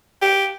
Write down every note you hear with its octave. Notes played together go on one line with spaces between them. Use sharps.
G4